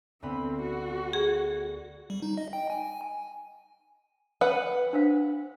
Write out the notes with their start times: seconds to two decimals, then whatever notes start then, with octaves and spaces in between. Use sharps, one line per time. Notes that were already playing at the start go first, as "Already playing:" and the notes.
0.22 D2 B3 C4 B5
0.62 F#4
1.13 G#4
2.10 G3
2.22 D#4
2.38 D#5
2.53 G5
2.70 G#5
2.84 G#5
4.41 B4 F#5 G5
4.93 D4 C5 F5